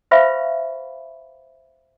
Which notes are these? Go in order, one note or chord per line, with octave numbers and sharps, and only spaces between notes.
B4 C5 E5 F5 B5 C#6